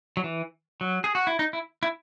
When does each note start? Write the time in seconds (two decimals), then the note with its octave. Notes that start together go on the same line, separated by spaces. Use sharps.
0.17 F#3
0.24 E3
0.81 F#3
1.04 G#4
1.15 F#4
1.27 E4
1.39 D#4
1.53 E4
1.83 E4